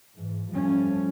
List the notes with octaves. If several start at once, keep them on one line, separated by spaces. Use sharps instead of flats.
G#2 E3
F3 G3 A3 C#4